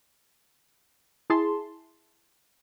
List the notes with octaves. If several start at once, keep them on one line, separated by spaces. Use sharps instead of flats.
E4 G#4 A5 C6